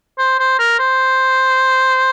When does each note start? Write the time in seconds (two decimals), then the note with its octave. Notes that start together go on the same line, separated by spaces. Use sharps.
0.18 C5
0.39 C5
0.59 A#4
0.79 C5